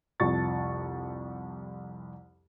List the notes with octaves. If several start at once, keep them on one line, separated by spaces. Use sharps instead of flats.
C2 F2 A5 C#6 A6